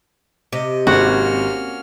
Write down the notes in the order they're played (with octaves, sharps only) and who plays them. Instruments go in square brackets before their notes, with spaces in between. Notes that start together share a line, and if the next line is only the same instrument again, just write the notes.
[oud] C3 [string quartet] D#5
[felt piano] G#1 [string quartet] A#3 C#4 F6 [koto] F#4